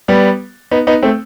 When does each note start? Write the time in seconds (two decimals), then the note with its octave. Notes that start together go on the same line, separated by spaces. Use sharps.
0.08 G3 B3
0.71 B3 D#4
0.87 B3 D#4
1.03 A3 C4